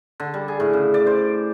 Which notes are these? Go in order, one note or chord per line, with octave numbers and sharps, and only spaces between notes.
D3
G3
G#4
A2
C#3
D5
C5